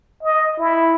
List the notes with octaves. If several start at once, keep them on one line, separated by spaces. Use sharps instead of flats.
D#5
E4